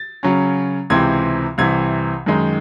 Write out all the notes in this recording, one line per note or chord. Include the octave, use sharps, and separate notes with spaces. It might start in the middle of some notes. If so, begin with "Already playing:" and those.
Already playing: A6
C#3 F#3 C#4
C#2 C3 E3 C4 G#6
C2 C3 E3 G#6
F#2 D#3 G#3 D#4